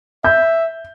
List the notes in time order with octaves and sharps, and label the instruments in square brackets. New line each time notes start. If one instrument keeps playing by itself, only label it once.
[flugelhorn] E5 [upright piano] G6